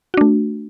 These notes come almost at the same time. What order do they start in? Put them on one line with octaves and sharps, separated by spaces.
F#4 D4 A3